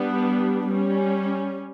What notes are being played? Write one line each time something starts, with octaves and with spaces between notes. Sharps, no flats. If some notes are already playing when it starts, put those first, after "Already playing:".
Already playing: G3 B3 D4
G3 C#4